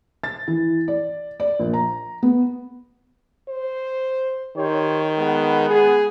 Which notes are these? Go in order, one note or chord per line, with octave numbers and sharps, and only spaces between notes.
A6
E3
D5
D5
A#1
A#5
B3
C5
D#3 G4 C5 C#5
G#3 B3
G#4